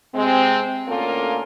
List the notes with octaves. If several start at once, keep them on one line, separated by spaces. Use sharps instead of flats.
C3 G#3 C4
D2 A#3 C#4 F4 A4 A#4